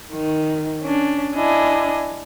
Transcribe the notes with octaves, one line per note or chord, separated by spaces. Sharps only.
D#3
C#4 D4
D4 E4 D#5 G#5